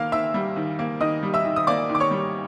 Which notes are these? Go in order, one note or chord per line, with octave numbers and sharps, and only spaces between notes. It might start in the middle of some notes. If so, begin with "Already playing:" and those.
Already playing: D#3 A#3 F5 F6
D#3 E5 E6
G3
D#3
A#3
D#3 D#5 D#6
G3
E5 E6
D#3
D#6
A#3 D5 D6
D#3
D6
C#5 C#6
G3